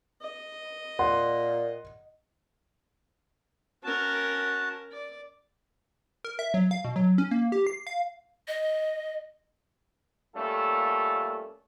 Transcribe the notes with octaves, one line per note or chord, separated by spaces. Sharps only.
D#5
A#2 F#5 C6
C#4 F#4 A#4 A5
D5
A#4
E5
F#3
F5
B2
F#3
C#4
A#3
G4
C7
F5
D#5
G3 A3 A#3 C#4 F4 A4